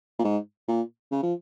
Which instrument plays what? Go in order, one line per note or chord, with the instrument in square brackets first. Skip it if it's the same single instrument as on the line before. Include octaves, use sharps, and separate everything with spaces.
[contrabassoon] A#2
G#2
A#2
C#3
F3